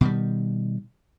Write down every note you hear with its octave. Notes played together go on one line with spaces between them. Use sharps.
B2 D#3 G3